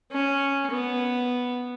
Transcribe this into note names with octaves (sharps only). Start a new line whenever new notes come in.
C#4
B3